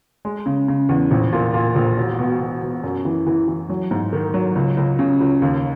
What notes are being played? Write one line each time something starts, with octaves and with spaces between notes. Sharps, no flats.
G#3
C#3
C#3
E2
A#1
A#2
A#2
A#1
E1
B2
B2
B2
F#2
E3
E3
E3
F#3
G#2
D#3
F#3
C#2
C#2
C#3
C#2
D#2